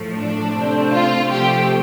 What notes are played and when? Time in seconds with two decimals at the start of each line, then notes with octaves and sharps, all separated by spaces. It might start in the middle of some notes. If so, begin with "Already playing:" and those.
Already playing: A2 F3 A3
0.14 D4
0.52 C3 A3 C4
0.90 F4
1.29 C3 F3 A3 C4 G4